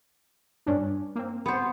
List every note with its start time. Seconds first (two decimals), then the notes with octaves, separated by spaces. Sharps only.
0.66 G2 C#4 D4
1.16 A#3 C4
1.46 B3 C5